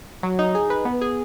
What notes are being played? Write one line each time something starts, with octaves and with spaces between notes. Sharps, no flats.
F#3
D#4
G#4
B4
B3
G#4